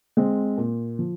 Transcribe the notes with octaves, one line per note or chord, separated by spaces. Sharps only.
G#3 C4
A#2
F3